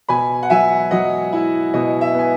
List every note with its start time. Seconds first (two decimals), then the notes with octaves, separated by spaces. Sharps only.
0.09 B2 G#5 B5
0.43 F#5
0.50 F#3 E5 G#5
0.91 F#3 D#5 F#5
1.33 E4
1.74 B2 D#5
2.01 E5
2.15 B3 G#5